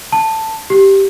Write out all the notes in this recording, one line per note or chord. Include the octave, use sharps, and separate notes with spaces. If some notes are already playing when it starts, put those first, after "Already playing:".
A5
G4